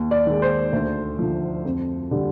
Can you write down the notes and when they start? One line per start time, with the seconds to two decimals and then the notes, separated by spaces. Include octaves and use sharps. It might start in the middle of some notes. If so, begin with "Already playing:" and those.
Already playing: D#2
0.11 D5
0.27 D#3 G#3
0.42 C5
0.73 D2
1.19 D3 F3
1.65 F2
2.11 D3 G3